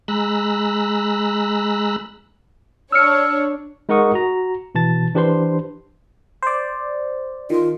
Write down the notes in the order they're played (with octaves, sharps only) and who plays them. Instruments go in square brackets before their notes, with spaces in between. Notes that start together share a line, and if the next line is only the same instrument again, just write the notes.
[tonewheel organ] G#3 A#5 B5 E6 F#6
[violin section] D4 C#5 [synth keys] E6 F6 C#7
[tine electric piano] G#3 D#4 A#4 F#5 C#6 D#6
F#4 A#5
B2 E3 A5 A6
E3 D4 G4 B4 C5 C6
[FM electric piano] C5 D5
[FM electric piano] D#3 [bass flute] F4